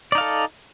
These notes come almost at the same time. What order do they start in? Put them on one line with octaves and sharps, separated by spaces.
D5 D#4 F5 A4